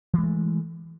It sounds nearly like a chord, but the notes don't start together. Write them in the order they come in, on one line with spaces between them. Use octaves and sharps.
E3 G#3 A3